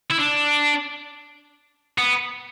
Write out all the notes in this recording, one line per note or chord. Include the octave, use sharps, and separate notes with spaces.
E4
D4
B3